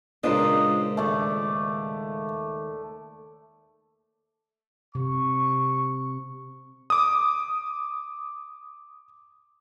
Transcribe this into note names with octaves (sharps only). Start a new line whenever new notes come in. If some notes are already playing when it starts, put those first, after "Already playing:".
C#2 A#2 D4 F4 A#4 C5 D#5
D#2 A3 D5
C3 C#6
D6 D#6